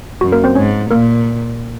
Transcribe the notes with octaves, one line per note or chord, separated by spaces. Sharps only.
F#2 F#4
A#3 A#4
C4 C5
G#2 C#4 C#5
A#2 A#3 A#4